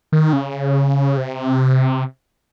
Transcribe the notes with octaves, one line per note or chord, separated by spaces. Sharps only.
D#3
C#3
C3